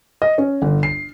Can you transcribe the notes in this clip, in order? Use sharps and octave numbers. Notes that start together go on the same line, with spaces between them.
D#5
C#4
G1
C7